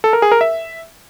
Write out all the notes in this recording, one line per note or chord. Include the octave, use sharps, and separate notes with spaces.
A4
A#4
G#4
A#4
E5